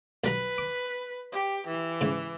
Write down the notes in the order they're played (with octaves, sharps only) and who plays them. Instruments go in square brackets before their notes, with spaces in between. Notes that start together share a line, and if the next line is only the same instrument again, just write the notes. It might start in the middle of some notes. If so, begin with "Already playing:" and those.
[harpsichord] B1 G3 A#5 [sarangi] B4
[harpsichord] D6
[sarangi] G4
E3
[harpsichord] G#2 C#3